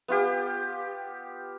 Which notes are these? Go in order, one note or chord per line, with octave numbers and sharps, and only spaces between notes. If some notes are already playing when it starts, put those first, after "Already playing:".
B3 F4 G4